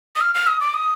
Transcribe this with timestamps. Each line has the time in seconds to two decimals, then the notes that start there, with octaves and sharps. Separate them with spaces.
0.16 D#6
0.21 F6
0.34 F6
0.47 D#6
0.60 D6
0.74 D#6